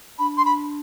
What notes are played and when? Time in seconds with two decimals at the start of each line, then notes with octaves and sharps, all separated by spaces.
0.19 D4 B5
0.37 C6
0.45 B5